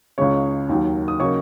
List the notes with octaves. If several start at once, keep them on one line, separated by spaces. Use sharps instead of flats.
C#2 C#3 G#3 C#4 C#5 C#6
D#2 D#3 F#3
D#6
C#3 F#3 A#3 D#4 C#5 C#6